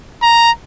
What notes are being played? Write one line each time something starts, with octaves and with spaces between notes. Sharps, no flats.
A#5